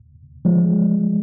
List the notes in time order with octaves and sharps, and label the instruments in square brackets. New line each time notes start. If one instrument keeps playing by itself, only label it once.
[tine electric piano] F3 G#3